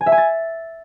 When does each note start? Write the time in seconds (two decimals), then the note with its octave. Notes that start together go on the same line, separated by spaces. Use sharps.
0.01 G#5
0.06 E5
0.12 G#5
0.18 A6